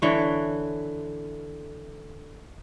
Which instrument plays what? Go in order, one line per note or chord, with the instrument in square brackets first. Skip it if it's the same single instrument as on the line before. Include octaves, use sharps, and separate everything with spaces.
[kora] D3 E3 C#5